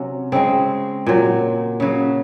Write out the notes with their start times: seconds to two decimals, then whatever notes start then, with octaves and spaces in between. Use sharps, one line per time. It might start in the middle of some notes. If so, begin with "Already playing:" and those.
Already playing: C3 F#3 C#4
0.32 C#3 G#3 C4
1.06 A#2 F#3
1.80 C#3 F#3